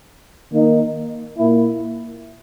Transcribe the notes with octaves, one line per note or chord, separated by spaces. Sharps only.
D#3 A#3 D#4
A#2 A#3 E4